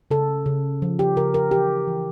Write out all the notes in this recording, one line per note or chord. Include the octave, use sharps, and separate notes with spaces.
C#3 A4
C#3
F3
G4
C#3 A#4
A#4
E3 G4
E3